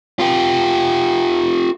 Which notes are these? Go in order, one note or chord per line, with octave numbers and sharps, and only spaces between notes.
F4 G4